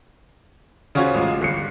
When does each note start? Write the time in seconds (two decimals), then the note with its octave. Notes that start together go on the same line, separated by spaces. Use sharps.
0.95 C#3 C#4 F4 F#4 C5 C#5
1.14 A1 G#3 F4
1.41 G1 C7 C#7